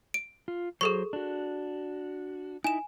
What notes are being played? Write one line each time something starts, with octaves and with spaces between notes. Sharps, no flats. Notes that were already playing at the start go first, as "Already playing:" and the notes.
D7
F4
F#3 G#4 A4 C5 C#6
D4 F#4
D#4 E4 G#5 E7